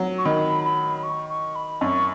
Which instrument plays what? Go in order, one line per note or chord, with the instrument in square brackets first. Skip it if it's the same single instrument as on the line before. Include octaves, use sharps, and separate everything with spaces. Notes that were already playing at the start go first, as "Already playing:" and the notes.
Already playing: [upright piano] F#3
[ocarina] C#6
[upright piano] D#3 [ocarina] B5
[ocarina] B5
C#6
C#6
B5
[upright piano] F#2 [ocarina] C#6